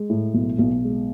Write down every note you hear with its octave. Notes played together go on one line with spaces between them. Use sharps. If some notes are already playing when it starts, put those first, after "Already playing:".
Already playing: G#3
A2
B1
B1
G#3